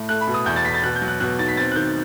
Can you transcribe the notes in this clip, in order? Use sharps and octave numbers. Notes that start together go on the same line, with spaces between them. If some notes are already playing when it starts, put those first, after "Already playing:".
Already playing: A2
A3 F#6
B5
B2
D#6
E2 G6
A6
E2 B6
A6
B2 F#6
G6
F#3
F#6
B2 F#6
D#4 A6
B6
C4 A6
F#6
D#3 G6